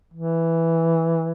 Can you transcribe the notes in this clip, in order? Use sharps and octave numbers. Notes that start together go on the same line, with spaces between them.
E3